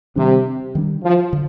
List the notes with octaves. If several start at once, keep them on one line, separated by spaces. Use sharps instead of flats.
C3 D#3 G3 D4
D#3 G3 D4
F3
D3